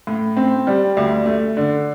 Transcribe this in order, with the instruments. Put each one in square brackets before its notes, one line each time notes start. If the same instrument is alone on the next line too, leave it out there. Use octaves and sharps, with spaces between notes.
[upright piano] A2
C4
G3
D2
A3
D3